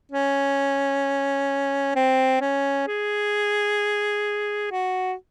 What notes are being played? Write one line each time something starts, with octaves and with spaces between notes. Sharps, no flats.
C#4
C4
C#4
G#4
F#4